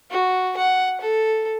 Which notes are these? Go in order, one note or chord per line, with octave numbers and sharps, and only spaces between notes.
F#4
F#5
A4